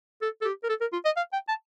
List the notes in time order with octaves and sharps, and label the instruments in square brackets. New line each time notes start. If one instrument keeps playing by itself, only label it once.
[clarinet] A4
A4
G4
A#4
A4
A#4
F4
D#5
F5
G5
A5